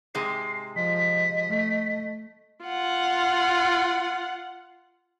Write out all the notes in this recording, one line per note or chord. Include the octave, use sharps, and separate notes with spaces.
G#2 C3 G#3 C7
F3 D#5 B6
A3
F4 F#5